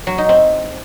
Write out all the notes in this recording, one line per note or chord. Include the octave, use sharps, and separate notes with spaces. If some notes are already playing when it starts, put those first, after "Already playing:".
F#3
D#4
C4